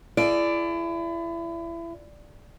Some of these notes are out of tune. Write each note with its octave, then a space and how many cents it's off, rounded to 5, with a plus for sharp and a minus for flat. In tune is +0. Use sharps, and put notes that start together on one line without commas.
E4 +30 G#4 +40 D5 +0